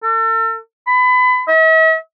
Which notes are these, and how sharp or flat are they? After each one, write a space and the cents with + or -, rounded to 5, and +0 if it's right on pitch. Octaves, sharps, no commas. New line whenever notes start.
A4 +40
B5 +30
E5 -45